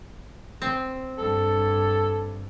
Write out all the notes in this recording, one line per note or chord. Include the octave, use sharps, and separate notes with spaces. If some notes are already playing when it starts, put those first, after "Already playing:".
C4
G2 A4